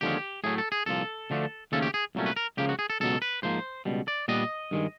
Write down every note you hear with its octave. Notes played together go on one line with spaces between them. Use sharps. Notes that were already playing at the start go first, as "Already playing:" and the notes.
D#2 D3 F3 G#3 C#4 G4
A2 F#3 A3 G#4
A4
G#4
C2 A#2 F3 A4
D2 D3 F3 A3 D4
D#2 C#3 F3 A3 C#4 A4
G4
G#4
C2 A#2 F#3 A3 C#4
B4
A#4
C#2 C#3 F3 A#3 G4
F#4
G#4
A4
C#2 B2 F#3 A4
B4
G#2 F3 A#3 C5
C#2 B2 G3
D5
A#2 G3 B3 D4 D#5
G2 D#3 G#3